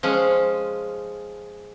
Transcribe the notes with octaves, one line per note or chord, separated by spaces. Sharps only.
F3 G#3 C#4